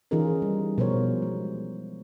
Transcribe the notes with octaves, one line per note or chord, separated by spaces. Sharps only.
E3 C#4 D#4 F4 G#4 A#4
G3
B2 F3 A#4 C5 C#5
G#3